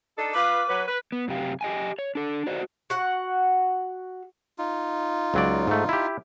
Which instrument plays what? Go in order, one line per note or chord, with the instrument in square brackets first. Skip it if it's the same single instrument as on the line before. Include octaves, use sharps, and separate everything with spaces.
[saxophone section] D4 D#4 A4
[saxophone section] F4 B4 [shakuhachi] D6
[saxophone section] F#3 B4
B4
[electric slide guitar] B3
F#2 C3 G4 F5
G4 D#5 G5 G#5
C#5
D4 A4
F#4 C5 D5 D#5
[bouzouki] F#4 F#5
[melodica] D#4 F4
[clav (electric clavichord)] C#2 F#3 D5
G#2 A3
E4 G4